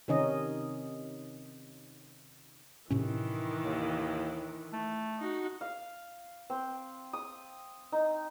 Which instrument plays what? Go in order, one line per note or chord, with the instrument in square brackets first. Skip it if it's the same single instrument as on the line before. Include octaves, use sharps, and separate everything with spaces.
[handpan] C3 D#3 C#4 D#4 D#5
[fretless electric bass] A2 C3 C#4 [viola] D#3 E3
[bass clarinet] D#2
A3
[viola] D#4 F#4
[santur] F5
C4
D#6
D#4